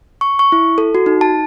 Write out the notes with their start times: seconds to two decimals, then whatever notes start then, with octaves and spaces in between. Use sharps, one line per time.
0.21 C#6
0.39 C#6
0.52 E4
0.78 A4
0.95 F#4
1.06 D#4
1.21 A5